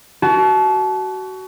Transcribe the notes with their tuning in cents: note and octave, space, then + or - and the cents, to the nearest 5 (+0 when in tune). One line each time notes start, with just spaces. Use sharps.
F#4 +25 A5 -25